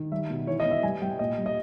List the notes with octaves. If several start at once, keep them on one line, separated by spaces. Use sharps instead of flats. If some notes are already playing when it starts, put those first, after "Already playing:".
Already playing: D#3
G3 E5
B2
E3 C#5
D#5
B3
E5
G3 G#5
G3 G5
A#2 D#5
G3
D#5